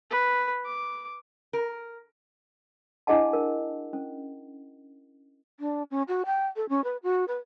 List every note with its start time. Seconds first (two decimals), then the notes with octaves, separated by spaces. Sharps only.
0.10 B4
0.65 D6
1.53 A#4
3.07 D4 E4 G#4 D#5 F#5 A5
3.33 A#4
3.93 C#4
5.60 D4
5.91 C#4
6.08 F#4
6.26 G5
6.56 A4
6.69 C#4
6.84 B4
7.03 F#4
7.28 B4